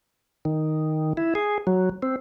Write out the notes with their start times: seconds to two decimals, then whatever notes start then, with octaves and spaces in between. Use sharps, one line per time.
0.45 D#3
1.17 E4
1.35 G#4
1.67 F#3
2.03 C4